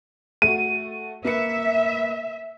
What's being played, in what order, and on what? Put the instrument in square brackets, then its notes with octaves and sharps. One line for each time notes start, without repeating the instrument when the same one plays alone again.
[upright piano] A3 F#4 [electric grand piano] D#7
[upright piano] A#3 B4 C#7 [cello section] E5